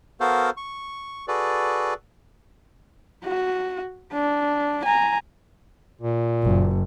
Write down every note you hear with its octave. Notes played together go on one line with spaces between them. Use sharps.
B3 F#4 A4 A#4 C5 F5
C#6
F#4 G#4 A4 B4 D5
F#4
D4
G#5 A#5
A#2
F#1